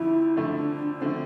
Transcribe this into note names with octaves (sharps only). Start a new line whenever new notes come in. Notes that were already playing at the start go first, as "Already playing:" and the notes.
Already playing: F2 D3 F3 A3 E4
F2 D3 F3 A3 D4
D3 F3 A3 C4